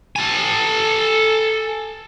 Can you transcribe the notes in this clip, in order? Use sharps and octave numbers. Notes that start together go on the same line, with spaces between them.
A4 G#5